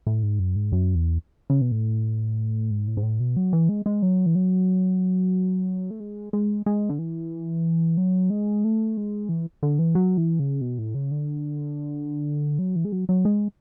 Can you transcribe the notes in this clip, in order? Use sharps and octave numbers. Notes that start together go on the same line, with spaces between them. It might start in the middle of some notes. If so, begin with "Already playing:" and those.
A2
G#2
F#2
G#2
F#2
E2
C#3
B2
A2
G#2
A2
G#2
A2
B2
F#3
E3
G#3
G#3
F#3
E3
F#3
A3
G#3
G#3
G#3
D3
E3
F#3
G#3
A3
G#3
E3
D3
E3
F#3
E3
C#3
B2
A2
C#3
D3
F#3
E3
G#3
F#3
F#3
G#3